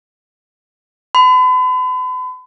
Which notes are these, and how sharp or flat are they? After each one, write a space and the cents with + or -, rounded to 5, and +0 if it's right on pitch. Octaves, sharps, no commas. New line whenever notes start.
B5 +40